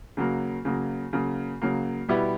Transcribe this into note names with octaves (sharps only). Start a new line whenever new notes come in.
C#3 F#3 A#3
C#3 F#3 A#3
C#3 F#3 A#3
C#3 F#3 A#3
B2 G3 B3 E4 G4